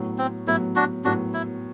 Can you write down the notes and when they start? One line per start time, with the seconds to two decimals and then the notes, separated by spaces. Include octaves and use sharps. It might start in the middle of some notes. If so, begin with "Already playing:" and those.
Already playing: A2 F#3 B3
0.18 C4
0.47 A2 F#3 B3 E4
0.76 D4 F#4
1.04 A2 F#3 B3 D4 F#4
1.34 E4